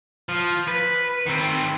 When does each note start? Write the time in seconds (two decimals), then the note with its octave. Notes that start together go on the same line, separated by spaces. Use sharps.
0.29 F3
0.68 B4
1.26 D#3 C4